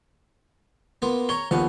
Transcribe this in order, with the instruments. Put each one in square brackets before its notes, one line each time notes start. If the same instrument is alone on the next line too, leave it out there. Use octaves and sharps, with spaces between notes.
[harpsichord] A#3 B3 F4
[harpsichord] C#5 A#5 [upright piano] C#6 G7
[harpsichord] A#1 F5 F#5 [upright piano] D#2 F3 B3